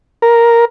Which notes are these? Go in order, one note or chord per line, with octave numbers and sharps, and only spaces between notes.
A#4